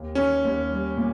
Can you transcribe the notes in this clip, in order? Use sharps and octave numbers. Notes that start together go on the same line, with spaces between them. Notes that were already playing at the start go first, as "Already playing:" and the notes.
Already playing: D#2 G4
D#3 C#4
D#2
G3
A#2